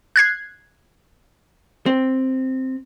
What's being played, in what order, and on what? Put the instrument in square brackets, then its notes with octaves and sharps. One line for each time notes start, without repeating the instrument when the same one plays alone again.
[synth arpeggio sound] F#6 G#6 C7
[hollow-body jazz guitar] C4